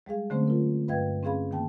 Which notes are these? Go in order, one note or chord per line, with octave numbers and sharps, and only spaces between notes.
G3 G#3 G#4 F5
D3 F#3 A3 C4 C#4 C5
F4 A#4
G2 B4 D#5 F5 G5 G#6
C4 C#4 G#4 F5 B5
D#3 A#3 G5 A5